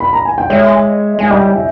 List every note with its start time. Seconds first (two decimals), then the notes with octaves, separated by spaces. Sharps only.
0.00 B5
0.13 A#5
0.25 G#5
0.38 G5
0.50 G#3 C#5 E5
1.19 G#3 G#5
1.30 G3 D#5 G5
1.56 E5